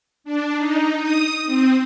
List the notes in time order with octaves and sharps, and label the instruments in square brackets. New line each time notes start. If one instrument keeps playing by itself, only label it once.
[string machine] D4
D#4
D#6
C4